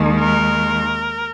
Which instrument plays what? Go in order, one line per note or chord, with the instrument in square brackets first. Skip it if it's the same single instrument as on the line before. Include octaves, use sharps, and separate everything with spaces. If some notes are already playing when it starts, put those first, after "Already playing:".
Already playing: [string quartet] D#2 D#3 G#3
A#4